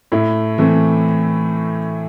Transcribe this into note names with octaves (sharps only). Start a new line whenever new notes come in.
A2 E4
E3 A3 C4